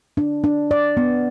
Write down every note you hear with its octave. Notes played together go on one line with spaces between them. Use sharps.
D4
D4
D5
B3